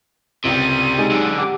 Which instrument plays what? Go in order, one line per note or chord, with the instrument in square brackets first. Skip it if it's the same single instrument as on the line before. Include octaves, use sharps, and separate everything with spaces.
[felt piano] C#2 [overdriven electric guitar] C3 G3 [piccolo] D#7
[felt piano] G#3 D#4 G4
[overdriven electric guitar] F#2 D3
[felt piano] G4 F#5 [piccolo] D6